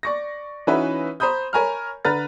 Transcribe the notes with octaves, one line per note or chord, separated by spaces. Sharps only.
D5 C#6 A#6
E3 C#4 D#4 F#4 B4 E5
C5 A#5 B5 D#6 G6
A#4 C#5 G#5 A#5 B5 F6
D3 B4 A#5 F6 A6